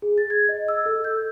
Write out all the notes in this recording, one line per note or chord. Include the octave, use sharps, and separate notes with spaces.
G#4
A6
G#6
D#5
E6
A4
G6